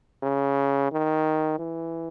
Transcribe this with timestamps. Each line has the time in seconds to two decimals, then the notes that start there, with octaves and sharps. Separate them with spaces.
0.23 C#3
0.92 D#3
1.59 E3